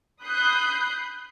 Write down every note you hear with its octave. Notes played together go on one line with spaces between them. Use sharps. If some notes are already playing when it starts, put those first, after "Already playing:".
B5 D#6 F#6 G6 C7